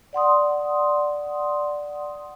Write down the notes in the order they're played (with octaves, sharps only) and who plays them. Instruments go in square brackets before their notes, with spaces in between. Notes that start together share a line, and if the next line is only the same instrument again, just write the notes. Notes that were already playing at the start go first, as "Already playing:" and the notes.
[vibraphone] D5 F#5 C6 D#6